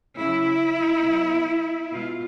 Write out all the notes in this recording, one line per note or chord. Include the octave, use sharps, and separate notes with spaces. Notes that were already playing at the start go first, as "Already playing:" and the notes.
C#3 F#3 E4
B2 F#3
B2 G#3 F4